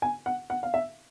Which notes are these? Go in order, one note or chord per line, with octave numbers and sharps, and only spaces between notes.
G#5
F#5
F#5
F5
E5